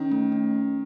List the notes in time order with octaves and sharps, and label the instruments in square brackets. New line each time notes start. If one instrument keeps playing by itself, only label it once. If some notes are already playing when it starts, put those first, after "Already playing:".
Already playing: [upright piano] D#3 [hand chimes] C#4
[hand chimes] A3
C#4